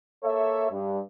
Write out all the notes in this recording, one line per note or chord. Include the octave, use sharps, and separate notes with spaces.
A#3 A4 C#5 E5
G2